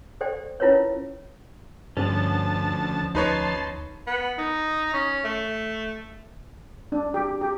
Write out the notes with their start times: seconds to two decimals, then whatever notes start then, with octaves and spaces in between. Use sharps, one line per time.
0.21 A4 C5 D5 G5
0.60 C#4 E4 F4 A#4 B4 C#5
1.97 D2 G2 F3 B3 C#4 A5
3.15 D2 D#4 B4 C#5 A5 C6
4.07 B3
4.38 D#4
4.94 C#4
5.25 A3
6.92 D4
7.14 G4
7.41 G4